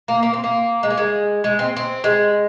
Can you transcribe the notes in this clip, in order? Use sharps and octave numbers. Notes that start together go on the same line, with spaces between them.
A#3
A#3
C4
A#3
G#3
A#3
G#3
G#3
C4
C4
G#3